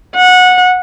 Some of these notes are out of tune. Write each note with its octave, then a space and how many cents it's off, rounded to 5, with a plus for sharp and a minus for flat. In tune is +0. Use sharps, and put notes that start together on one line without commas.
F#5 -20